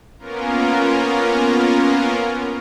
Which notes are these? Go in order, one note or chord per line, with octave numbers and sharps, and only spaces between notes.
A#3 B3 C#4 F4 A#4